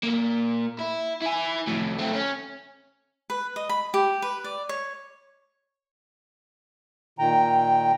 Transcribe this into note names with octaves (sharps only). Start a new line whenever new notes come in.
A#2 A#3
E4
E4 G#5
F2 A2
A3 C4
C#4
B4
D#5
B5
G4
B4
D5
C#5
A#2 D#3 G5 A#5